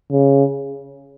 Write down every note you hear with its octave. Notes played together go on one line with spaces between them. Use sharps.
C#3